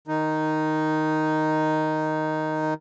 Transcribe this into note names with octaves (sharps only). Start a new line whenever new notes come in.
D#3 D#4